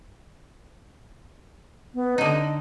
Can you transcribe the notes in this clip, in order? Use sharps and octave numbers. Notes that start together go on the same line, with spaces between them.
B3
D3 D#4 D#5